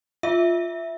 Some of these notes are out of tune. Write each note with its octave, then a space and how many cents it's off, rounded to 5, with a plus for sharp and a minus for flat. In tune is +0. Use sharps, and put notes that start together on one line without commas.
F4 +0 E5 +0